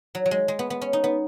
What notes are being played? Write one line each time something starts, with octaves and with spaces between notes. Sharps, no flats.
F#3
F#3
G#3
G#3
B3
B3
C#4
D#4
B3